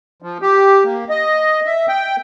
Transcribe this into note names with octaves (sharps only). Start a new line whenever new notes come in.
F3
G4
A#3
D#5
E5
G5